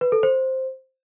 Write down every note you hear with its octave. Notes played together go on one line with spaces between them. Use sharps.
B4
A4
C5